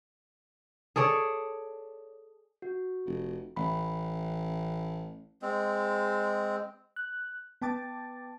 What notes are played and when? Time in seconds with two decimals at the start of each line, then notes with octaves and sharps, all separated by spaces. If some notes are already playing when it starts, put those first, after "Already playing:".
0.96 G#4 A4 C#5 D5
2.62 F#4
3.06 F1
3.56 A1 B5
5.42 G#3 C4
6.96 F#6
7.62 B3 G5 A5 D6 A6